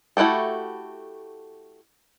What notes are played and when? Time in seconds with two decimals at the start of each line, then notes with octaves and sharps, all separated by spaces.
0.17 A3 E4 F#4 G4 A4